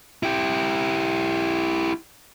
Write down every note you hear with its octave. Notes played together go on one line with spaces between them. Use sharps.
E4 G4